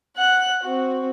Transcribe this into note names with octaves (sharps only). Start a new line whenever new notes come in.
F#5 F#6
C4 F#4